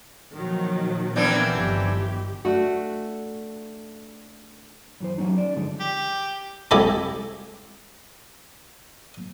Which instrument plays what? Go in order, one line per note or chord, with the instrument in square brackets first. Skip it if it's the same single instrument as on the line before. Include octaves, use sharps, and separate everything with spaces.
[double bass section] A#2 F3 [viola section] D#3 F#3
[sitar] E3 C4 D4 [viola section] B3 A#4 F5
[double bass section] G1 D#3 F3 [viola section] G4
[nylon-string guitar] A3 D4 F#4
[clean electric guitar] F#2 E3 C5
F#3 G3 C#4 D#4
C#4 D5
G2 D3 F3 G#3 D#4
[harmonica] G4
[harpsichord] C2 G#3 G4 A4 B5